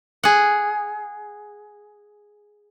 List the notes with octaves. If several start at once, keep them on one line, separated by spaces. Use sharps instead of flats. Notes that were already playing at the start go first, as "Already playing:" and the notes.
G#4 F#5